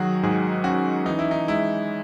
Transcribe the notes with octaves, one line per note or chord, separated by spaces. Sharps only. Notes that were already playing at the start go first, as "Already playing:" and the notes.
Already playing: D#3 F#3 F#4 G#4
G#2 G#4
C#4 F#4
E3 D#4
E4
D#4
G#3 E4